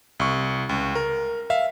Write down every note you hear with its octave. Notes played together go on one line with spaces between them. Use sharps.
C2 C#6
C#2
A#4
E5 F5